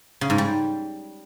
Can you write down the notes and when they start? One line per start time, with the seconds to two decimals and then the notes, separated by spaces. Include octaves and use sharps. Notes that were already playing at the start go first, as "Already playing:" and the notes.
0.21 C#3
0.30 G#2
0.38 G3